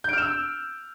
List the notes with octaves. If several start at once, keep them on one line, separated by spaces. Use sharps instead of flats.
E6 F6 G6 D7 E7